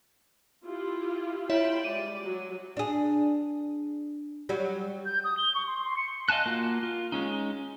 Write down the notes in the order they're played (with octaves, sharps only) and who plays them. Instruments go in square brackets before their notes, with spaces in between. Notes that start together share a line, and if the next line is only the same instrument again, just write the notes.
[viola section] E4 F4 G4
[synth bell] E4 C#5 E5 [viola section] F4 G5 B5
[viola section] G3 G#3 D5 [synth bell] D#7
[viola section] F#3
[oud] D4 G#4
F#3 G3
[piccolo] G6
D#6
G7
C#6
C6
C6
C#7
[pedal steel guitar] D#5 F5 G#5 A5 F#6
A#3 F4 F#4
F4
G#3 C#4 D#4